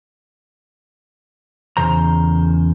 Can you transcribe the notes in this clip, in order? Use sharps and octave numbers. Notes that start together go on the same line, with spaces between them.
E2 C#3 C5 A#5